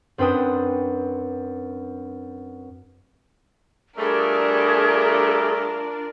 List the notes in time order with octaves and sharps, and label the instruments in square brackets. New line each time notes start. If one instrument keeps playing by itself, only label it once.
[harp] F#2 C4 D4 B4 G5 D#6
[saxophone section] G3 A3 [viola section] D4 F4 D5 [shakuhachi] G#4 [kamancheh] A#4